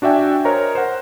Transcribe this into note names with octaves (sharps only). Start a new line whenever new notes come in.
D4 F#4 D5 E5 G5 G#5
A#4 C5 C#5 D#5 A#5
C5 F#5